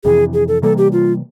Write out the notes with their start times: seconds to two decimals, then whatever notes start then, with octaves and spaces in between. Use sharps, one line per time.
0.04 F2 C3 E3 G#4
0.34 G#4
0.48 A4
0.62 C3 E3 G3 A#3 A4
0.78 G4
0.92 F4